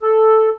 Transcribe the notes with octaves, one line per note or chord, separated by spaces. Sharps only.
A4